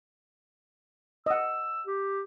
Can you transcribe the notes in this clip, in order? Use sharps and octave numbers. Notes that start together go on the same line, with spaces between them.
D#5 F#5 E6
G4